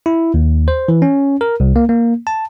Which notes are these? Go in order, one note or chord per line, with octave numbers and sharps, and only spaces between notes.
E4
D#2
C5
E3
C#4
A#4
C2
A#3
A#3
A5